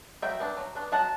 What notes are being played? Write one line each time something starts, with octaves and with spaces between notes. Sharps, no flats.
F#3 E5 G5
B3 D4
F#3
B3 D4
F#3 F#5 A5